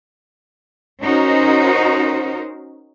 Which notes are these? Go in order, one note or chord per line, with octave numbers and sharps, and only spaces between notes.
C#4 D#4 F#4 A#4 C5